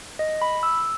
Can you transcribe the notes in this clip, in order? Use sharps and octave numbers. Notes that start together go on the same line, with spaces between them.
D#5
B5
E6